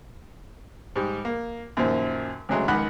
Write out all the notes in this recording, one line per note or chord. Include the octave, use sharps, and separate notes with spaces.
G#2 G3
A#3
F#2 A#2 D#3 F3
D2 C#3 F#3 G#3 A3
C#2 D#3 F#5 B5 F#6